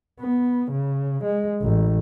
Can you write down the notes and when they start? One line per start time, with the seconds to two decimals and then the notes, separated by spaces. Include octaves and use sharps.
0.20 B3
0.71 C#3
1.23 G#3
1.62 A1